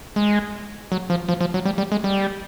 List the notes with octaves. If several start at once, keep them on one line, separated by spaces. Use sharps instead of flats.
G#3
F#3
F3
F3
F3
F#3
G3
G3
G#3
G3